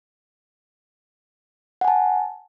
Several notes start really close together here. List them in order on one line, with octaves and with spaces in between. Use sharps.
F#5 G#5 A5